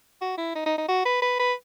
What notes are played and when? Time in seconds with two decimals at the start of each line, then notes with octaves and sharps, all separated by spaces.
0.22 F#4
0.38 E4
0.55 D#4
0.66 D#4
0.78 D#4
0.88 F#4
1.05 B4
1.22 B4
1.39 B4